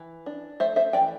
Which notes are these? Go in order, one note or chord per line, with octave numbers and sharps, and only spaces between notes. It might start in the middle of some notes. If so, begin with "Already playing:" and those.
Already playing: E3
D4
A3 C5 E5
C5 E5
E3 D5 G5